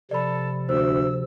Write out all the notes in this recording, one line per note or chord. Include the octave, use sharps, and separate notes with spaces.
C3 F3 A4 D5 B5
D2 C5 E6